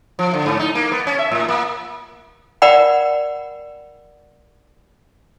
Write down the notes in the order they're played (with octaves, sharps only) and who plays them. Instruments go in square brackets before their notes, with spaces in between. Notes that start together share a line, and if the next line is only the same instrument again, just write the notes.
[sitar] F3
D3
G#2
D#4
A#3
B3
C#4
E5
A2
A#3
[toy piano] A#4 D5 F#5 G5 B5